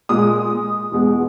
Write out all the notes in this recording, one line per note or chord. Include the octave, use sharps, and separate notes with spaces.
A#2 G#3 D#6
E2 B2 G#3